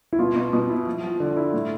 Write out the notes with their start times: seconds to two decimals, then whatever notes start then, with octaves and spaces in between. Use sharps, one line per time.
0.13 E4
0.19 B2 F4
0.36 B2
0.53 B2
0.69 E4
0.86 F3
1.03 F3
1.20 D3
1.37 E4
1.53 A2